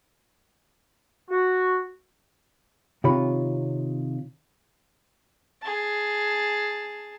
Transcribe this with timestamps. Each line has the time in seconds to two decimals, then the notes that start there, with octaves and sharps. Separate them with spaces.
1.30 F#4
3.04 C3 D#3 F4 C#5 B5
5.62 G#4 A5